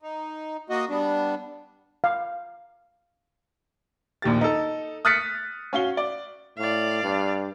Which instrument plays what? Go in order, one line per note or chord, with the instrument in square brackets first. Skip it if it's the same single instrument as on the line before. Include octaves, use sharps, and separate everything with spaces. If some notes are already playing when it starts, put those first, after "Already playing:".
[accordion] D#4
A#3 F#4 D#5
G3 B3 D4
[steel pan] F5
[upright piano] A#1 D#2 G4 A6
D#4 A4
D#6 F6 F#6 A6 B6 C#7
C#4 F#4 F5 G7
D5
[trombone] A2 [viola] D5 F5
[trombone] G2